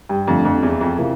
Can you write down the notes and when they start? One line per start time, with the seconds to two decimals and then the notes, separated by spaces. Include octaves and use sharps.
0.09 G2
0.27 F2 D3 F3 A3 D4 F4
0.45 F2
0.63 E2
0.81 F2
0.98 C3 E3 A#3 F4 A#4